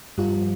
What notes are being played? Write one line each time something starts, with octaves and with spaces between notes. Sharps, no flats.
G2 F3 G3 F4